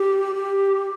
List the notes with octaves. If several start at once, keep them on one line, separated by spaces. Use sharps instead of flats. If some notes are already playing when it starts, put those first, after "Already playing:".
Already playing: G4
G4